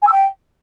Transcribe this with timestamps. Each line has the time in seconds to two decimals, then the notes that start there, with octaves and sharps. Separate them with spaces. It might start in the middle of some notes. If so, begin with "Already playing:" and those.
0.02 G#5
0.07 E6
0.12 G5